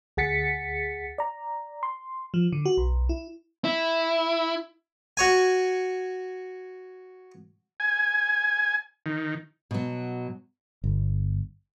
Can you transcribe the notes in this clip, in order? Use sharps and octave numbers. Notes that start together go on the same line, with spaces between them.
D2 G#4 F#5 A6 B6 C#7
D5 A#5
C6
F3
D3
F#4
B1
E4
E4
F#4 C#5 G#5
G#5
D#3
B2 F#3
G1